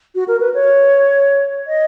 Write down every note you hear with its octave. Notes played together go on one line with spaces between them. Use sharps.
F#4
A#4
B4
C#5
D#5